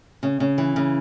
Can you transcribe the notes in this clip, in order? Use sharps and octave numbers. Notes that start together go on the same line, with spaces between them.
C#3
C#3
E3
C#3